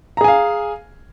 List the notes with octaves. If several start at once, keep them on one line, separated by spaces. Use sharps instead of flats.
G#4 F5 G#5 A#5